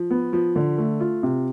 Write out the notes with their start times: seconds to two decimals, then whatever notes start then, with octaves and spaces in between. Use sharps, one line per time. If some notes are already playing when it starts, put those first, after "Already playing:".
Already playing: F3
0.11 B3
0.33 F3
0.56 D3
0.78 A3
1.00 F4
1.23 C3